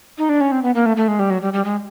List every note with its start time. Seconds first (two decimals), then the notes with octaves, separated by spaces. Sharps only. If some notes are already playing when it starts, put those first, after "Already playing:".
0.18 D#4
0.29 D4
0.41 C#4
0.52 C4
0.63 B3
0.75 A#3
0.86 A3
0.97 A3
1.08 G#3
1.19 G3
1.30 F#3
1.42 G3
1.53 G3
1.65 G#3